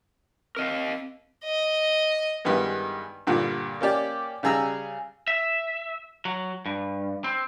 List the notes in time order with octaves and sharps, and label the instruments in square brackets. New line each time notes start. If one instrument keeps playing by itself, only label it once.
[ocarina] C4 [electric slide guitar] A#4 D#5 F5
[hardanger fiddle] D#5
[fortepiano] G2 D#3 E3 G#3 B3
G2 A#2 D3
A#3 C#4 G4 D5
C#3 G3 G#4 A#5 E6
[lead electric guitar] E5
F#3
G2
C4